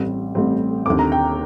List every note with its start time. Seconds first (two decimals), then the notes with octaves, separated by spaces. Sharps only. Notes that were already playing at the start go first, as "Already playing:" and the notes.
Already playing: A1 A2 G3 C4
0.35 A1 A2 G3 C4
0.86 D#2 D3 A3 C4 D6
0.99 A#5
1.12 G5